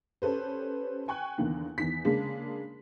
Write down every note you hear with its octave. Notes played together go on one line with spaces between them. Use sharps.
C#4 G4 A4 B4 C5
G5 G#5 C#6 F#6
E2 D3 D#3 A#3
E2 D#3 B6
C#3 G#3 A#3 D4